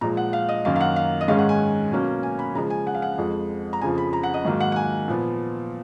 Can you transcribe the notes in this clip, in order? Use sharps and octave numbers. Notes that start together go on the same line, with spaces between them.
A#2 F3 G#3 A#5
F#5
F5
D#5
F#2 D#3 F#3 A#3 F5
F5
F#5
F5
D#5
G#2 D#3 G#3 C#4 F5
F#5
G#5
B2 F#3 A#3 C#4
G#5
B5
C#3 F3 G#3 A#5
G#5
F#5
F5
F#5
F2 F3 G#3
A#5
F2 C#3 F3 G#5
B5
A#5
F#5
D#5
G#2 D#3 F#3 A#3
F#5
F#5
G#5
A#2 F3 B3